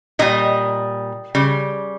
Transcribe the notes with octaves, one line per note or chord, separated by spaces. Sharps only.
A#2 G3 D#5
C#3 G3